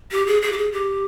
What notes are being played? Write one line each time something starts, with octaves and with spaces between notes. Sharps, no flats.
G4
G#4
G#4
G4
G#4
G4